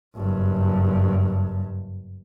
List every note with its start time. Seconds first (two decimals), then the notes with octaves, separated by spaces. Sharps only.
0.16 F#1 G2